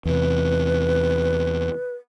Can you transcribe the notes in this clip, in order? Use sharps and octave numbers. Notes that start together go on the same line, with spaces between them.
E2 C3 B4